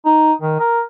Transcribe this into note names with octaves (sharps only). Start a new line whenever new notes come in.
D#4
D#3
A#4